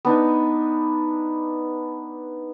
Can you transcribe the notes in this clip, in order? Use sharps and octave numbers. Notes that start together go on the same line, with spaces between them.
B3 D4 D#4